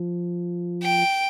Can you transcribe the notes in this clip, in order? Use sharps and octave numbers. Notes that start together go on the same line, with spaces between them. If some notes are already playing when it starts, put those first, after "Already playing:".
Already playing: F3
G5